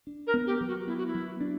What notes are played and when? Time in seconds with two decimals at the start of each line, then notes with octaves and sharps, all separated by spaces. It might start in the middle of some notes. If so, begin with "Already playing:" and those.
0.07 D4
0.27 A#4
0.34 B3
0.47 G4
0.60 F#3
0.68 F#4
0.87 B3 E4
0.97 F#4
1.07 E4
1.15 F#3
1.41 D4